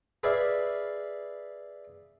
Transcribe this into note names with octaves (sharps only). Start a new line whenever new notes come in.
G#4 B4 D5 E5 F5